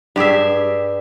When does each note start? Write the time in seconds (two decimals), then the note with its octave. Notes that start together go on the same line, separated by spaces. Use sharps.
0.16 G2 G4 G#4 E5